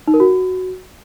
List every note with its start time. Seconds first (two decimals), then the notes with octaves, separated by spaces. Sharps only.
0.07 D#4
0.14 A#4
0.20 F#4